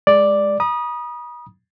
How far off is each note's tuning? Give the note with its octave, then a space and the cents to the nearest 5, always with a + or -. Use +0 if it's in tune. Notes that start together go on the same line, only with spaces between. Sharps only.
G#3 +0 D5 +0 D6 +0
B5 -45 D#6 -10